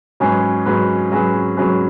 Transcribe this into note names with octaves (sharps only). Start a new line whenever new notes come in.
G#2 F#3 C#4 G#4 B4
G#2 F#3 C#4 G#4 B4
G#2 F#3 C#4 G#4 B4
G#2 F#3 C#4 G#4 B4